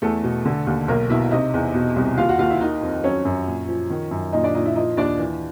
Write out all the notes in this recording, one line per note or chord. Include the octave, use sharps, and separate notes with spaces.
E2 A3 A4
B2
D3
D#2
B1 A#3 A#4
B2 E4 E5
C3 D#4 D#5
E2
B2
C2
D#2 F4 F5
F#4 F#5
D#2 F4 F5
E4 E5
D#3 D#4 D#5
F2
F#3 C#4 C#5
F#2
A#2
F3
D#3
F#2
A#2 D#4 D#5
D4 D5
A#2 D#4 D#5
E4 E5
F3 D#4 D#5
D#2 D4 D5
E3